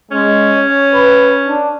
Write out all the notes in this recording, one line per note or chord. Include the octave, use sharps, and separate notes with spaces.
G#3 C#4
C#5
B4
D4